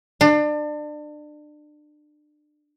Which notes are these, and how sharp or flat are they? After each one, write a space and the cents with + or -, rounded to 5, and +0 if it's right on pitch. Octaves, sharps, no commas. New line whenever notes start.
D4 +30